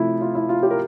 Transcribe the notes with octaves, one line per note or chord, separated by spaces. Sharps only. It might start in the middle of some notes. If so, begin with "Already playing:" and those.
Already playing: C3 F3 A3 E4
F4
E4
F4
G4
A#4